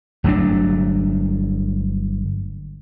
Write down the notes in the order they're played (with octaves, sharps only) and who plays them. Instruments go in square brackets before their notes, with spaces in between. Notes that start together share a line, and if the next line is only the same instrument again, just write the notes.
[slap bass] G1 F#3 A3 D4